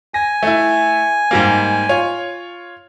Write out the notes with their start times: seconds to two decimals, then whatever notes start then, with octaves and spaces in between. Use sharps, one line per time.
0.14 G#5 A#6
0.43 A3 E4
1.31 G#2 G3 A#3
1.89 F4 C#5